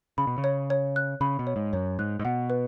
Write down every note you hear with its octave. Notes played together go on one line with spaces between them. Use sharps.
C#3 B5
B2
C#3
C#5
C#5
F#6
C#3 B5
B2
C#5
G#2
F#2 C#5
G#2 F#6
G#2
B2 F#5
B4